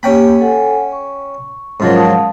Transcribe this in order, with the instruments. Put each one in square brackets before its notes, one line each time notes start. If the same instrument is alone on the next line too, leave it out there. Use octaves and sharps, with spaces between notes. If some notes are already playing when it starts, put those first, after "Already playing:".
[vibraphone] A#3 G4 [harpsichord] C#4 G5 B5
[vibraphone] A4 F#5 G#5
C#6
[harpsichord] G#2 F3 F#3 [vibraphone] C#4 F4 A#4
[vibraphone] F5 A5 D#6